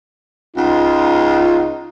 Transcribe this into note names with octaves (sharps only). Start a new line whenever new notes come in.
C#2 D#4 F4